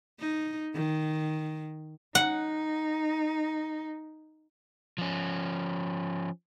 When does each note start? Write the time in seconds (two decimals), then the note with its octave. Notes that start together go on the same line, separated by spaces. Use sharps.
0.20 D#4
0.75 D#3
2.15 D#4 F#5
4.98 F3 C#4